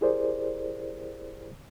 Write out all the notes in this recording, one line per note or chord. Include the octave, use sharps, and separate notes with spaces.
E4 G4 G#4 A#4 C5 D5